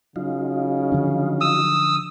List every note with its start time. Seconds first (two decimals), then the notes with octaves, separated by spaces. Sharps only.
0.16 C#3 F#3 D#4 F4
0.92 D3 F3 D4
1.41 D#6 E6